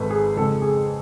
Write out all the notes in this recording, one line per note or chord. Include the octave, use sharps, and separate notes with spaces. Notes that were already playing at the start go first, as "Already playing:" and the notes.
Already playing: G#1 G#2 G#3 A4 B4
G#4
F2 C#3 G#3 A4
G#4